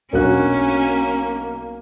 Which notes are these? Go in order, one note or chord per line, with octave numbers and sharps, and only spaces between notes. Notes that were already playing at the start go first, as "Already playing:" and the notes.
B1 A#3 C#4 D4 F#4 A#4 F#6